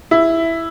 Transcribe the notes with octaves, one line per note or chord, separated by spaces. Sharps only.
E4